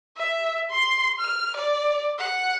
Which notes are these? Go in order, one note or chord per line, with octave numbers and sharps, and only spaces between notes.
E5
C6
F6
D5
F#5